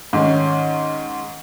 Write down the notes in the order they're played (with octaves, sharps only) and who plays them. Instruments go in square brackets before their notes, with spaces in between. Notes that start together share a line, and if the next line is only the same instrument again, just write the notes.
[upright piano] G#2 D#3 C#4